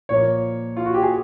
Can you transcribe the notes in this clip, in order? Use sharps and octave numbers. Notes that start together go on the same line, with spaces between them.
A#2 F3 A#3 C#5
F4
F#4
G4
G#4